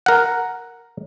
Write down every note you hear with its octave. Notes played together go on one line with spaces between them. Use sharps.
A#4 F#5